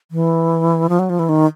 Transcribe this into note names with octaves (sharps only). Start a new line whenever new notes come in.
E3
F3
F#3
F3
E3
D#3